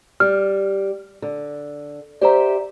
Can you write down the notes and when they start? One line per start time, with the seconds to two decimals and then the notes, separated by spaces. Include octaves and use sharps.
0.20 G3 F6
1.22 D3
2.21 G4 C5 D5 E5 A#5